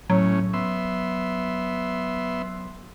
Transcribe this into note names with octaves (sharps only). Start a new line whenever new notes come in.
A2 F#3 C#4
B3 E5 C6